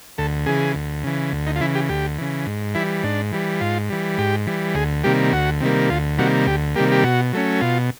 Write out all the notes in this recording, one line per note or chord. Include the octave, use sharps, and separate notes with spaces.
D2 A4
C#3 E3 G#4
D2
C#3 E3
D2
D#4
F4
C#3 E3 E4
G4
D2 G4
C#3 E3
G#2
E3 G3 E4
G#2 D4
E3 G3
G#2 F4
E3 G3
G#2 G4
E3 G3
D2 G#4
C3 D#3 G3 A#3 G4
D2 F#4
C3 D#3 G3 A#3
D2 F4
C3 D#3 G3 A#3 F#4
D2 G4
C3 D#3 G3 A#3 G4
G4
B2 F#4
F#3 A3 C#4
B2 F4